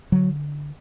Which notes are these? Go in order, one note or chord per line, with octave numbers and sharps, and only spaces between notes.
D3 F#3